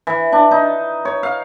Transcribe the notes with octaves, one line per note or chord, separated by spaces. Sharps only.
E3
D4
D#4
C#5
F5